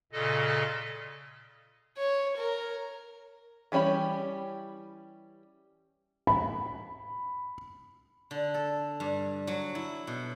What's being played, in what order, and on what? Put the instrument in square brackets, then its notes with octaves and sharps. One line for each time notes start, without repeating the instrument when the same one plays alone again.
[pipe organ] A#2 C#3 A4 D#5
[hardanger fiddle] C#5
A#4
[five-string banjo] E3 G3 C#4 G4 B5
[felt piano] B5
[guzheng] D3
A4
G2
F#3
E4
B2